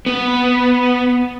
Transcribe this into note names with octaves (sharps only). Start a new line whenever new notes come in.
B3